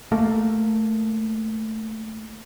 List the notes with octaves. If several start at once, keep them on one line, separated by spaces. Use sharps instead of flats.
A3 A#3